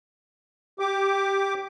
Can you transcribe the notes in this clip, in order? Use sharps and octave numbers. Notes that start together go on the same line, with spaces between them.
G4 D6